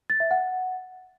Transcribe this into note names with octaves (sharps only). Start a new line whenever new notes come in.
A6
E5
F#5